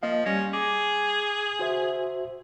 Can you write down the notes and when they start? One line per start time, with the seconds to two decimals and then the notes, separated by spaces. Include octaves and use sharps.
0.03 F3 A#3 D#5 F5
0.26 G3 C#4 A#6
0.53 G#4 D6
1.59 F#4 C5 E5